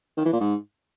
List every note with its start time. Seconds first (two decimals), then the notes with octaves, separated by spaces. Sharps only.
0.17 D#3
0.25 E3
0.33 A#2
0.41 G#2